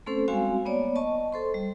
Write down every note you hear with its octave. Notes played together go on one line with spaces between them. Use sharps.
A3 C4 C#4 A4 C5
G3 G#3 C4 F#4 F5 G#5
A#3 B3 C#5 D5
D#5 A5 C#6
A4 C5 C6
G3